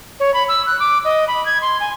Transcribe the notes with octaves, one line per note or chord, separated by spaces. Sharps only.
C#5
B5
E6
F#6
D6
D#5
B5
G#6
C6
G#5